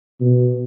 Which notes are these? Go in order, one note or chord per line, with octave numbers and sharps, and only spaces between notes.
B2